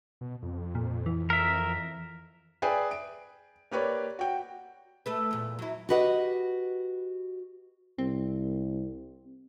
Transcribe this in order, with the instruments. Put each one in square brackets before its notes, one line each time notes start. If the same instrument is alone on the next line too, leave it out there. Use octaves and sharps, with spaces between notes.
[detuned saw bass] B2
F2
[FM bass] A#2
E3
[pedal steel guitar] A#4 E5
[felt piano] G#4 B4 D5 E5 G5 G#5
D7
A#3 G4 B4 C#5 D5
F#4 G5
[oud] A3 A4 B4
E2 A#2
F#3 E4
[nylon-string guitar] F#4 G4 B4 D#5 F#5
[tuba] C2 [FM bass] C4